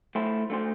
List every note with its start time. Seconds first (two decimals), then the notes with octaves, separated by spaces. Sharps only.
0.15 A3 E4 C5
0.50 A3 D4 C5